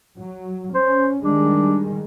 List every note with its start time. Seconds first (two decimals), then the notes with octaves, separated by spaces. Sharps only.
0.17 F#3
0.75 C#4 C5
1.24 D#3 G3 G#3 D4